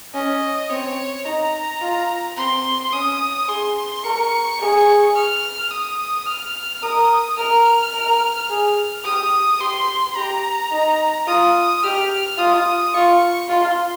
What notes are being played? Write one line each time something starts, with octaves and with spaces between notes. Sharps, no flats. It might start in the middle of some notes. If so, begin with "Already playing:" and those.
C#4 D#5
C4 C#5
D#4 A#5
F4
C4 C6
C#4 D#6
G#4 C6
A#4 C#6
G#4
F6
D#6
F6
A#4 D#6
A#4 F6
A#4
G#4
G4 D#6
G4 C6
G4 A#5
D#4
F4 D#6
G4 F6
F4 D#6
F4 C#6
F4 C6